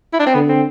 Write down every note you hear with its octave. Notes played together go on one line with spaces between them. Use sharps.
E4
D4
C4
D3 B3
C4